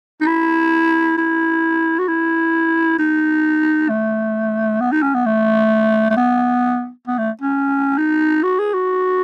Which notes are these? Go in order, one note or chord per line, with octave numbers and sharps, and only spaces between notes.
D#4
E4
E4
F#4
E4
D#4
A3
B3
D#4
C#4
B3
A3
A3
B3
B3
A3
C#4
D#4
F#4
G#4
F#4